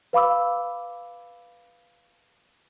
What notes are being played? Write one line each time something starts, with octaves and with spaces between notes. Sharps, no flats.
B4 F5 B5 D6 E6